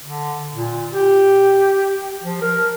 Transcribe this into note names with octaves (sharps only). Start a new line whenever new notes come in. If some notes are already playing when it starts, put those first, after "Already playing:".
D3
A#2
G4
F3
A#4